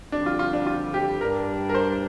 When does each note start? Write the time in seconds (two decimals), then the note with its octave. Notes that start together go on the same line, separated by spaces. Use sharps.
0.12 F2 D3 G3 D4
0.26 F4
0.39 F4
0.53 D4
0.67 F4
0.94 G4
1.21 G2 G3 D4 A#4
1.69 A#4
1.75 C5